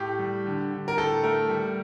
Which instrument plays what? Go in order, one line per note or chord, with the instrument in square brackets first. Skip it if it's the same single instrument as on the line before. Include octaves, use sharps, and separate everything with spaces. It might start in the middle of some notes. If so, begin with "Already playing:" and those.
Already playing: [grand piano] A2 G4
G3
D3
D3
A#4
A2 A4
A3 A#4
G3